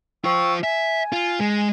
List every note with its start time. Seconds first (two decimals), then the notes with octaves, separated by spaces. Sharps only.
0.25 F4 C5 G5 C#6 E6
0.64 E5 G#5
1.12 F4
1.40 G#3